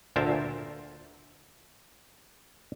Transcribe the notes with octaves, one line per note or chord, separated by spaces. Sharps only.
D2 A#2 A#4 C5 E5 A5